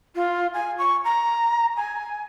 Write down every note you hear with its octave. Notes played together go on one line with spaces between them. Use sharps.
F4
G#5
C#6
A#5
G#5